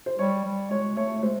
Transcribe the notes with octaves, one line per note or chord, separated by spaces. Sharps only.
C5
G3 C#5
G3
G#3 C#5
A3 C#5
C#5
G#3 C5